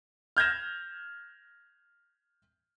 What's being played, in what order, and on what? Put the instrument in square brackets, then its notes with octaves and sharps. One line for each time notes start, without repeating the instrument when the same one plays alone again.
[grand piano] F6 G6 G#6 A#6 E7